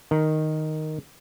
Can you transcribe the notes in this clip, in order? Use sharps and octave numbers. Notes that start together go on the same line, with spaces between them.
D#3